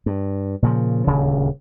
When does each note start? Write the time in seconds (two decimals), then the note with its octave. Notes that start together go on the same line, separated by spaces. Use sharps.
0.06 G2
0.62 A#2 C#3 F3
1.07 D#1 D2 C#3